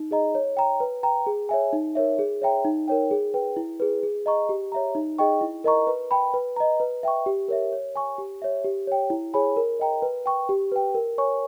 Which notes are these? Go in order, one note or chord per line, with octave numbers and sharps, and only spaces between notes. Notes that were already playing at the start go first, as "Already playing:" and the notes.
Already playing: D#4
G#4 D#5 A#5
C#5
G5 A#5
B4
G5 A#5
G#4
C#5 E5 G#5
D#4
A#4 C#5 E5
G#4
C#5 E5 G5 A#5
D#4
A#4 C#5 G5
G#4
B4 G5
E4
G#4 B4
G#4
D#5 A#5 C#6
G4
C#5 E5 A#5
D#4
G#4 D#5 G5 C#6
E4
A#4 D#5 A#5 C#6
B4
G5 B5
B4
D#5 A#5
B4
E5 G5 C#6
G4
A#4 C#5 E5
C#5
G#5 C#6
G4
C#5 E5
G4
C#5 G5
E4
G#4 C#5 G#5 B5
A#4
D#5 G5 A#5
B4
G5 C#6
G4
B4 G5
A#4
C#5 G#5 C#6